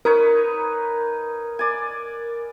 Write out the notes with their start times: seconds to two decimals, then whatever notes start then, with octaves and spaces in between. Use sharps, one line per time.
0.05 D#4 A#4 B4 C#5
1.59 D5 G#5